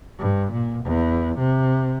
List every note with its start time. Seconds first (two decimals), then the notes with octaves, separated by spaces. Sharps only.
0.19 G2
0.52 A#2
0.84 E2
1.39 C3